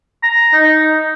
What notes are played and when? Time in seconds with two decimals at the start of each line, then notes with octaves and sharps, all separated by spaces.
0.23 A#5
0.53 D#4